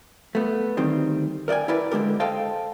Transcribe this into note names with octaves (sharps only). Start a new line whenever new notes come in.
A3 B3
D2 D#3 G3 C4
A#4 D5 D#5 G5 G#5
E4 A#4 B4 D5
D3 G#3 G4 A#4
A4 C5 D#5 F5 G5 A5